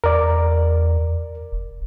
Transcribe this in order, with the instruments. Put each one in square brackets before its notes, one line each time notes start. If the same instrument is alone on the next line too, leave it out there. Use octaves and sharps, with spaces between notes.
[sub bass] E2 [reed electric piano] A#4 D5
[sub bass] F1